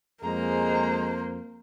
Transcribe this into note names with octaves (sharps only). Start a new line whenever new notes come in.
F2 G#3 A#3 C5 A#5